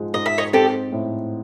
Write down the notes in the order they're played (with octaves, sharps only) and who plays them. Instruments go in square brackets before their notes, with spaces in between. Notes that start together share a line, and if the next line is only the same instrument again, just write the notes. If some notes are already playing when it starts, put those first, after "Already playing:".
Already playing: [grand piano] G#2 F3 G#3
[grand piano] G#2 [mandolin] D#5
[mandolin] E5
C#5 D#5
[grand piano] C4 [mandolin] G4 A4
[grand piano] A2